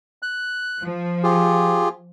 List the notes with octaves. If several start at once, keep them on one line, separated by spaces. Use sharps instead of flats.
F#6
F3
F4 G4 G#4